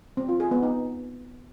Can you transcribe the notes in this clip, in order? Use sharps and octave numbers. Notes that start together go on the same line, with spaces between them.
C4
F4
G#4
B3
D#4